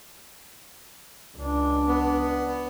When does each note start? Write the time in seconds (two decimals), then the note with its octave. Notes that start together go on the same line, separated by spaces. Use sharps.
1.37 C#2 D4
1.88 B3